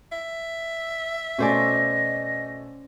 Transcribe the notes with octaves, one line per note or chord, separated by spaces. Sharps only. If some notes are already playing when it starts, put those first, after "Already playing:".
E5
B2 A3 C#4 C5 D5 D#5 G#5